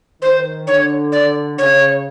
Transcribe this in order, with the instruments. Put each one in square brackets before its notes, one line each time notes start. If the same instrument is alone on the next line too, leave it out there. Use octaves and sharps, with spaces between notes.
[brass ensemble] D#3 [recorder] C5
[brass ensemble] D3 [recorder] C#5
[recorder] D5
[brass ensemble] C#3 [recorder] C#5